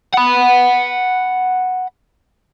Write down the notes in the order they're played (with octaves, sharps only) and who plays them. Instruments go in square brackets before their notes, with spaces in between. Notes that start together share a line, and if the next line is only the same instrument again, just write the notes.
[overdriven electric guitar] F#5 B5